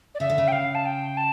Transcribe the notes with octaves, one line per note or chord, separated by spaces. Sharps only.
D5
C#3 E5
D3
C#3
G5
F5
A5
G5
A5